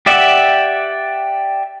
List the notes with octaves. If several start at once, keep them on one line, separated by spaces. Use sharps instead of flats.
G4 D5 E5 F#5